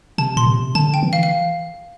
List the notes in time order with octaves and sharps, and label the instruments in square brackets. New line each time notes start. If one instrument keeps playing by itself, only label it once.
[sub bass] C3 [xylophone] A5
[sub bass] A#2 [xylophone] C6
[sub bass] C3
[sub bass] D3 [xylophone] A5
[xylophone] G5
[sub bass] E3
[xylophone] F5
F5